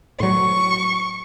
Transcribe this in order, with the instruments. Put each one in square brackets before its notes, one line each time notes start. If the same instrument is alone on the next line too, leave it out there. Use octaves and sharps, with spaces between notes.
[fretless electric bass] A2 F#3 [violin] C#6